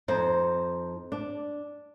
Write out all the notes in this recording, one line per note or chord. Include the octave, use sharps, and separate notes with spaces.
F2 D#4 C5
D4